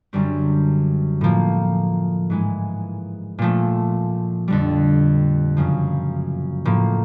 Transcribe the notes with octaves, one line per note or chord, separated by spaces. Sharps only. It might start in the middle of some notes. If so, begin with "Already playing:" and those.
F#2 D3 G3 C4
A2 F3 A#3
G#2 E3 G#3
A#2 F3 A3
F2 D3 G3
F#2 C#3 F3
A2 F3 A#3